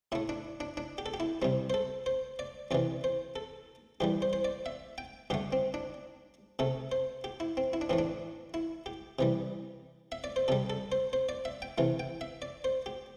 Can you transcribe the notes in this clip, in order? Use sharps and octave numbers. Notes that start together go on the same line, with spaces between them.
A2 A3 E4
D4
D4
D4
G4
A4
G4
E4
C3 G3 C4
C5
A4
C5
D5
E2 C3 E3 D5
C5
A4
G2 E3 G3 G4
C5
C5
D5
E5
G5
G2 D3 A3 G4
C4
D4
C3 A3 A4
C5
G4
E4
C4
E4
D4
A2 E3 A3 C4
D4
E4
G4
C3 E3 G3
E5
D5
C5
C3 G3 A4
A4
C5
C5
D5
E5
G5
C3 E3 A3
G5
E5
D5
C5
G4